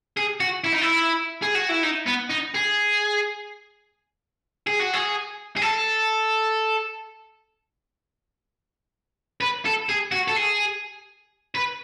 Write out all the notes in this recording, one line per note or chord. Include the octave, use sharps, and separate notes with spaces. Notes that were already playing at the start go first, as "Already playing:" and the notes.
G#4
F#4
E4
D#4
E4
G#4
F#4
E4
D#4
B3
D#4
G#4
G#4
F#4
G#4
G#4
A4
B4
A4
G#4
F#4
A4
G#4
B4